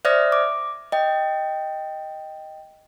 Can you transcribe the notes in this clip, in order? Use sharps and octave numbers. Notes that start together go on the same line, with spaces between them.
C5 D5 E5 D#6 F6 A#6
D6
D#5 G5